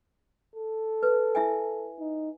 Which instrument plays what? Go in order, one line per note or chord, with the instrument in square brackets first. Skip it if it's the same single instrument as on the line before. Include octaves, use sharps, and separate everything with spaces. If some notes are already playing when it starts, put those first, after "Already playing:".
[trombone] A4
[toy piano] B4
E4 E5 G#5
[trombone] D#4